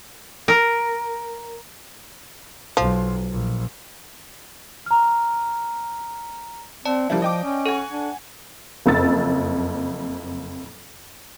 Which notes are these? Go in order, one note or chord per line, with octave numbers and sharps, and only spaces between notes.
A#4
B1 F3
A#1
A#5 F6
C4 D5 A5
F3 G3 A#3 E4
D#5 G5 D6
C#4
A4 F#5 G#5
D4
F#1 F2 E6 A6